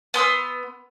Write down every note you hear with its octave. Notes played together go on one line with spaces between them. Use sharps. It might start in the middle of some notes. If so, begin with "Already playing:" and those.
B3 C6 D#6 E6